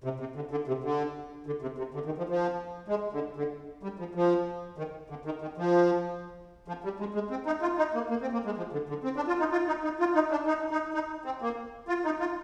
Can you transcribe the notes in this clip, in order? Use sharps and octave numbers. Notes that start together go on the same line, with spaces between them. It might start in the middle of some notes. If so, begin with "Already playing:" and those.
C3
C3
D3
D3
C3
D3
D3
C3
C3
D3
D#3
F3
F3
G#3
D3
D3
G3
F3
F3
D#3
D3
D#3
D#3
F3
F3
G3
G#3
G#3
C4
D#4
F4
D#4
A#3
A#3
C4
A#3
G#3
F3
D3
D3
C4
D4
F4
D#4
F4
D#4
D#4
F4
D#4
D4
D#4
D#4
D#4
C4
A#3
F4
D#4
F4